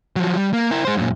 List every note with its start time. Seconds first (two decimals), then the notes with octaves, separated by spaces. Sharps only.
0.16 F3 F#3
0.37 G3
0.53 A#3
0.71 E4 A#4
0.85 G#3 C5
0.97 F#2 A#2